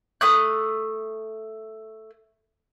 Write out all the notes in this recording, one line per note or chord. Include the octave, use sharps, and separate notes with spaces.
A3 D#6 F#6